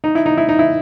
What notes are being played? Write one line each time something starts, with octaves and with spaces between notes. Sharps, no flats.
D#4
E4
D#4
E4
D#4
E4